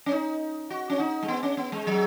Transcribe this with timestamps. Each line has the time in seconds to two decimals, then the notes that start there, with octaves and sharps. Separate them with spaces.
0.06 C#4
0.12 D#4
0.70 F#4
0.90 C#4
1.00 D#4
1.23 G#3
1.28 B3
1.43 C#4
1.57 B3
1.72 G#3
1.87 F#3